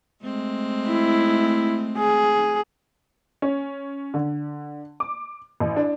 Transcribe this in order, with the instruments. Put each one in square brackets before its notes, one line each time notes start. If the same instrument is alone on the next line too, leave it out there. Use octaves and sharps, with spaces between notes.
[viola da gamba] G#3 A3 C4
[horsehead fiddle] E4
G#4
[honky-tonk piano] C#4
D3
D6
A1
D4